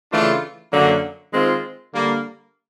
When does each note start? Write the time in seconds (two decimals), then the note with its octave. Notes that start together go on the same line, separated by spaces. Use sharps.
0.11 C#3 E3 A3 D4 F4
0.72 F#2 D3 F#3 A#3
1.33 D#3 G#3 C4 F4
1.93 D3 G3 A#3